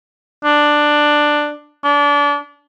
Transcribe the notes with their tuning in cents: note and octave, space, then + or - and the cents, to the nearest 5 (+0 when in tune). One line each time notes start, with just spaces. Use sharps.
D4 +10
D4 -30